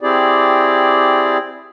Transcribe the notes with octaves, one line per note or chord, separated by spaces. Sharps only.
C4 E4 G4 G#4 D5